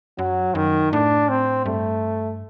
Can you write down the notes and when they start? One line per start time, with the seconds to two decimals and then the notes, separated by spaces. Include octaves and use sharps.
0.18 F#2 F#3
0.55 F#2 D#3
0.93 A2 D4
1.29 C4
1.66 G2 A3